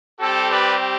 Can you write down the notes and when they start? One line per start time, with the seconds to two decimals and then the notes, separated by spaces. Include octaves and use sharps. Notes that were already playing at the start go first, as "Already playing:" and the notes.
0.20 G3 C4 G4 A4
0.50 B4 D5